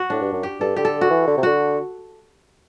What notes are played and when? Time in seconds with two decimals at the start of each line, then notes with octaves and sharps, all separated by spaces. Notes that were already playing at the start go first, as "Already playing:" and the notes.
Already playing: F#4
0.10 A2 D4
0.21 G2
0.33 F#2
0.43 G4
0.60 G2 A4
0.76 D3 G4
0.85 A4
1.01 F#4
1.10 E3
1.27 D3
1.37 C3
1.43 D3 F#4